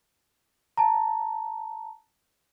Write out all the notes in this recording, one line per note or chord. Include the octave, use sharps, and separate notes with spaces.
A5 A#5